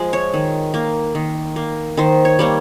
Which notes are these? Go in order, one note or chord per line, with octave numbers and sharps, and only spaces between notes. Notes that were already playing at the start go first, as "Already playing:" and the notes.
Already playing: F3 G#3 G#4
C#5
D#3
A#3
D#3
A#3
D#3 C5
C#5
G3 A#3 C#5